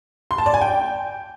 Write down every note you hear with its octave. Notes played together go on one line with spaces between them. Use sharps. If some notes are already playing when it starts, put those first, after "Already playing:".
C6
A5
D5
G#5
G5